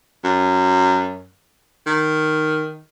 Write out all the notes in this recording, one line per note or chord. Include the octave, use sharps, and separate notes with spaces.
F#2
D#3